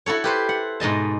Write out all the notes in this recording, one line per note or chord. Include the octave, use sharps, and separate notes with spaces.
E4 F#4 A4 C#5
G4 B4 C5
F#5
G#2 B2 D#5 A5